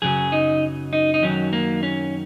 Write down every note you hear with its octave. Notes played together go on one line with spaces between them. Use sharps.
F#2 C#3 F#3 G#4
D#4
D#4
D#4
F#2 D#3 F#3 C#4
A#3
C#4